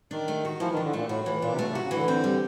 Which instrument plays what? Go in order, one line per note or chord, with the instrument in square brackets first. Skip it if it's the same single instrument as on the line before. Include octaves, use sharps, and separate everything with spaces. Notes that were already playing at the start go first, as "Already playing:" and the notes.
[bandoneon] D#3 [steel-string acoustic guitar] D4
[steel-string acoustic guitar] A3
F#4
[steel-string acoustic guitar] E3 [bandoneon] F3
[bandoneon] D#3
[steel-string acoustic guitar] D4
[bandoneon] D3
[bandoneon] A#2 [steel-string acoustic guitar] A3
[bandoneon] A2 [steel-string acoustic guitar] F#4
[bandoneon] A2 [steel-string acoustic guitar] E3
[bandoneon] A#2 [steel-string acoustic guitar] D4
[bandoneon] C3
[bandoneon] B2 [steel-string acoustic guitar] A3
[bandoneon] C3
[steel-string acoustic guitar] F#4
[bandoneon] C#3
[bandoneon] D3 [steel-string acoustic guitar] E3
[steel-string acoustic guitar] C4
G3